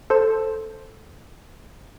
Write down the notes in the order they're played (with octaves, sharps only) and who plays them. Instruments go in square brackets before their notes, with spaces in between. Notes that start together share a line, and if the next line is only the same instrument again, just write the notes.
[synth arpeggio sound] A4 C5 E6